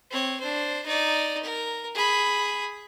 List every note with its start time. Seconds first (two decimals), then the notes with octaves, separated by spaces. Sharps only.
0.11 C4 C#5
0.40 D4 C5
0.85 D#4 D5
1.43 A#4
1.95 G#4 B5